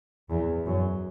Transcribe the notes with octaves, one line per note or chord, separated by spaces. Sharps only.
E2
F#2